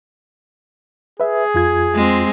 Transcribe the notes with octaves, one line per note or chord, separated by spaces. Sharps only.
G#4 B4 E5
F2 F4 G#6
G#3 C4